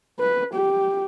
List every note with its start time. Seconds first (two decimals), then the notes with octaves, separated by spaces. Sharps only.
0.20 B4
0.54 G4